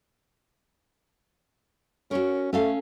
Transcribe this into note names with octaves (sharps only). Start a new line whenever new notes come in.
C#4 F#4 A#4
A3 C#4 A4 F5